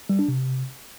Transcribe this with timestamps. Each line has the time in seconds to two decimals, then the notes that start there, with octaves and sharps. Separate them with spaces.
0.09 G3
0.19 D4
0.28 C3